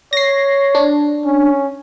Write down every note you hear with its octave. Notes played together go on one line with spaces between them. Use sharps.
C#5 A#6 C7
D4
C#4